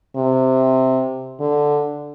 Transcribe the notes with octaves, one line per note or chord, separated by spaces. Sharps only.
C3
D3